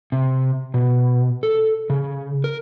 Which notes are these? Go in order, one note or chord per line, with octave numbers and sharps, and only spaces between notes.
C3
B2
A4
C#3
A#4